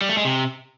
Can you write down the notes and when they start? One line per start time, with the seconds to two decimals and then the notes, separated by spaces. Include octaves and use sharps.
0.01 G3
0.09 A3
0.17 G#3
0.25 C3